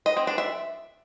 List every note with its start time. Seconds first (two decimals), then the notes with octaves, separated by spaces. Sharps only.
0.06 D#5
0.17 C4
0.27 D4
0.38 E5